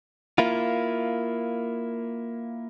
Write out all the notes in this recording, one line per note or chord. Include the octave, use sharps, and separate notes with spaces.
A#3 E4 F4